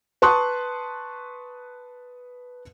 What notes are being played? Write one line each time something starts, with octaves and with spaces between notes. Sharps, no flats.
B4 A5 C6 C#6 D#6 F#6